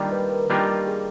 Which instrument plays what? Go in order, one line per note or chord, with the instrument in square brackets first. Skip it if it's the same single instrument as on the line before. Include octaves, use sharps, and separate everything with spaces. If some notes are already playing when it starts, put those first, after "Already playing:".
Already playing: [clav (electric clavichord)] D#3 G3 A#3 D4 F4
[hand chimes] B4
A#4
[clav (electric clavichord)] D#3 G3 A#3 D4 F4 [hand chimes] G4
[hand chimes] G#4